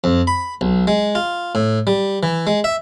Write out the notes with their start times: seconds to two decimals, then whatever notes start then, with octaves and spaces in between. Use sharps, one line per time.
0.04 F2
0.27 B5
0.61 B1
0.87 G#3
1.15 F4
1.55 A2
1.87 G3
2.23 E3
2.47 G#3
2.64 E5